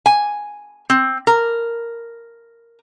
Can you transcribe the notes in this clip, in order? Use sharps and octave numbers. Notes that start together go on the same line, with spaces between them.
G#5
C4
A#4